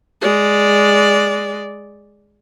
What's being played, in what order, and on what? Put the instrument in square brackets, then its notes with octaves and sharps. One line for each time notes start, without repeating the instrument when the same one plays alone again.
[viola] G#3 D5